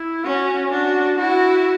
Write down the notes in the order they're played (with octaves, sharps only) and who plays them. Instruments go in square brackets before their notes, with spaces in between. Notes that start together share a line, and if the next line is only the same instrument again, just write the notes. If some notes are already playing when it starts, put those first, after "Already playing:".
Already playing: [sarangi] E4
[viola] C#4 [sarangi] F#4
[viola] D4 [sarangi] F#4
[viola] E4 [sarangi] F#4